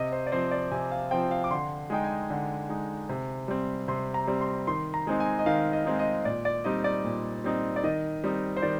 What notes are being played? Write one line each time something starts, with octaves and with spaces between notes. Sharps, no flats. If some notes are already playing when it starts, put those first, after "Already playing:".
Already playing: C3 D#5
C5
D5
F3 C4 C5
D5
C3 G#5
F5
F3 C4 G5
F5
D6
D3 C6
G#3 D#4 G5
G#5
D3
G#3 D#4
C3
G3 C4
C3 C6
A#5
G3 C4
C6
D#3 C6
A#5
G#3 C4 D#4
G#5
D#5
D#3 F5
D#5
G#3 C4 D#4
D#5
A#2 D5
D5
G3 C4 D#4 D#5
D5
A#2
G3 C4 D#4
D5
D#3 D#5
G3 C4 D#4
C5
D#3 D5